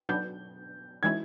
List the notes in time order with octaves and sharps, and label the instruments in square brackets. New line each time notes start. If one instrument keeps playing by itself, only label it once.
[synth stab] B2 F#3 B3 D4 [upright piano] G6
[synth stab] E3 G#3 C#4 E4 [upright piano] G#6